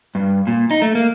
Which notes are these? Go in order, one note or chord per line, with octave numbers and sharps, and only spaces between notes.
G2
A#2
D#4
A3
A#3